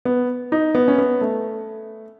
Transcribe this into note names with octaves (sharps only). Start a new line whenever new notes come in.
B3
D#4
B3
C#4
B3
A3